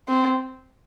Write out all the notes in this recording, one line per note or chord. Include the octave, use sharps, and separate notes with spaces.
C4